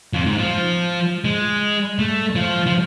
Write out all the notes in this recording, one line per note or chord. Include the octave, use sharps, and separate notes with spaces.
F2
G#2
F3
G#3
A3
F3
F3